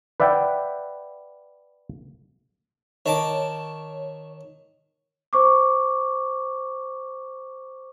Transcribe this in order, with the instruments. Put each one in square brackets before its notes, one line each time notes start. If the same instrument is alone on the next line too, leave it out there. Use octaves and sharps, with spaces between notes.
[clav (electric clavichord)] B4 D5 E5 F#5 G5
[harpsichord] D#3 A5 D6 [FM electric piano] C#5
[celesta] C5 C#6 D6